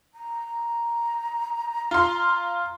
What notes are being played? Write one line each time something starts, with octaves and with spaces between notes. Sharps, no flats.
A#5
F4 C6